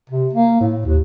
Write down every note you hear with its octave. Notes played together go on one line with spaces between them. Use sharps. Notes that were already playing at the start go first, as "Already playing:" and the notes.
C3
A#3
A2
D#2